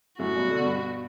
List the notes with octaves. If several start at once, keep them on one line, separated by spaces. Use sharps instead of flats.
F#2 A2 F#4
G2 B2
B2 D3
G2 B2